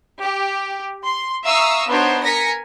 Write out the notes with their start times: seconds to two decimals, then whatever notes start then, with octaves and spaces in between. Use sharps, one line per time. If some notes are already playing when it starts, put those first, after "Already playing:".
0.21 G4
1.04 C6
1.45 E5 F5 A#5 C#6 D#6 E6
1.89 B3 D4 D#4 F#4 C5 C#5
2.24 A#4 G#5 A#6 B6 C#7